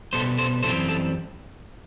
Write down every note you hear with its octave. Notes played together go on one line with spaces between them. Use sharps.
B2 G3 B3 A4 C5
A4 C5
F#2 E3 G3 C4 A4 C5
A4